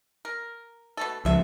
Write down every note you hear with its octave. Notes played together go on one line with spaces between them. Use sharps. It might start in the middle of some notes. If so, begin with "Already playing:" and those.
A#4
B2 A3 A4
C#2 F3 A4 E5